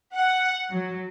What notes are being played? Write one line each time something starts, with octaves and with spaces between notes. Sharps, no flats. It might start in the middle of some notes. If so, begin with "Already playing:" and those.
F#5
F#3